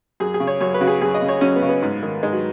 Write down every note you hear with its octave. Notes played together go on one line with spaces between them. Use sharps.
F#2 G#4
G#4
C#3
C#5
F#2 C#5
B4
C#3 F#4
G#4
F#2 G#4
D#5
C#3
C#5
F#2 C#4
B3
C#3
B3
G#2
D#3
G#2 G#3
F#3